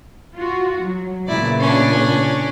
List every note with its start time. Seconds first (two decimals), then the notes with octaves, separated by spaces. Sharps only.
0.36 F4 F#4
0.82 F#3
1.27 A#2 C#3 B3 E4 D5
1.60 C#4 D4